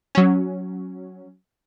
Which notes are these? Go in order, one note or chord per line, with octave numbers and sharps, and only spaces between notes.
F#3 C#4